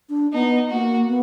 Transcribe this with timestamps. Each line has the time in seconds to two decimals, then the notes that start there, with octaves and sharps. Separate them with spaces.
0.09 D4
0.33 B3 D#4
0.70 A#3 F#4
1.07 B3